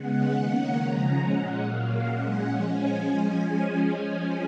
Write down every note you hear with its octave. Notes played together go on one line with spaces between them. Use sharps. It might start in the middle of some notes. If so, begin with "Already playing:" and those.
Already playing: C#3 G#3 B3 F#5
D#3 A#3 C#4
C#3 F3 G#3 C#4 A#5
A#2 G#3 C#4 F#5
A#2 F#3 A#3 F5
A#2 G#3 C#4 F#5
F3 G#3 C#4 G#5